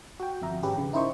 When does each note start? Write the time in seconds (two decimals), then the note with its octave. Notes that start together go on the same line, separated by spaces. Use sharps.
0.20 F#4 G5
0.42 G1 F2 E5 A#5
0.62 G#1 G#3 C#4 G4 B4
0.78 C#3
0.93 D#4 E4 A#4 C5 D#5 C#6